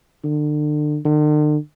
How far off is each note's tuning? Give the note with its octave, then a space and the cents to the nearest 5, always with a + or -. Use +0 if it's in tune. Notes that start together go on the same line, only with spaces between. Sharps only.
D3 +35
D3 +45